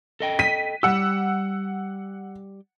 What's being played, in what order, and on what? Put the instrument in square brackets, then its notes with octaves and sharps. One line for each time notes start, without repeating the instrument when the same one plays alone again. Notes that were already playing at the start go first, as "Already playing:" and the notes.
[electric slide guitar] A4 D#5 G5
[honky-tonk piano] B6 D#7
[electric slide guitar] G3 G4 [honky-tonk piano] F#5 E6